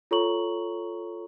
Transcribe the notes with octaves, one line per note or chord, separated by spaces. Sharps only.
F4 A4 C#5 A#5 C#6 F#7